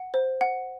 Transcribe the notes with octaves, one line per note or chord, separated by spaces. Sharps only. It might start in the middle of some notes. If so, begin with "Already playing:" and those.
Already playing: F#5
C5
F#5